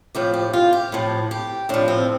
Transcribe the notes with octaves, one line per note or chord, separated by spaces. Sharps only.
A2 F3 G4
G4
F4
G4
A2 F3
G4
A2 F3 D4
C4